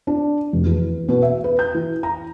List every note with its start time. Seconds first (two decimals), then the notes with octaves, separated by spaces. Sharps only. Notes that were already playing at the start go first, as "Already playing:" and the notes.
0.07 D4
0.53 F1
0.66 E2
1.09 B2
1.22 E5
1.44 B4
1.59 G6
1.74 E3
2.03 A#5